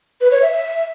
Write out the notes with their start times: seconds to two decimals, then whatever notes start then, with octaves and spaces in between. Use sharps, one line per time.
0.21 B4
0.32 C#5
0.42 E5
0.52 E5